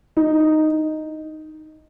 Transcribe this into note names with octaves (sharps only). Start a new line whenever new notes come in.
D#4